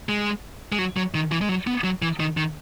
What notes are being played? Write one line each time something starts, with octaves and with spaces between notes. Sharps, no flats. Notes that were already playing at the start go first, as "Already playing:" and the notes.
G#3
G#3
F#3
F#3
D#3
E3
G#3
F#3
B3
F#3
E3
D#3
D#3